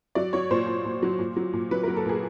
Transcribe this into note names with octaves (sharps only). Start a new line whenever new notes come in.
F#3 D5
F#3 C#5
A#2 C5
A#2
A#2
F#3
A#2
F#3
A#2
F#3 B4
A#4
F#3
A4
A#2 G#4